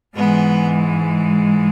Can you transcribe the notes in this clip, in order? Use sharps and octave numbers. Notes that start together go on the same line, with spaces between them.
G#2 E3 G#3 B3